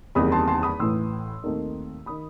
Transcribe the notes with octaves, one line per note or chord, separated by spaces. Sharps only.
F#1 E2 D#3 G3 C4 B5 D#6
A5 C6
A5 C6
B5 D#6
A1 A2 E3 C6 E6
D#2 D#3 A3 C4
D#3 B5 D#6